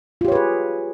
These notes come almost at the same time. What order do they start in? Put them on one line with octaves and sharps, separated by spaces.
F4 G4 C#5 B4 G#4